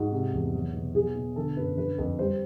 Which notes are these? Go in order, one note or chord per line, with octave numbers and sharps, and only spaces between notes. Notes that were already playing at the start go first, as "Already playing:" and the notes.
Already playing: G#2 F#4
C3
E2
F#3
B2
F#3 G#4
B2
D3 A4
F#2 B4
D3 B4
F2
G3 C5